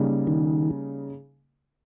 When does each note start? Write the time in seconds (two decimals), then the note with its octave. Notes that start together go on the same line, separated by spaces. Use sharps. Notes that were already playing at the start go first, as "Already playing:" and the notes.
Already playing: C#3 G3 A#3 D#4
0.27 D#3